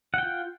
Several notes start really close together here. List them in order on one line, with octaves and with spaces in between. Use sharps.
F#5 G5 F4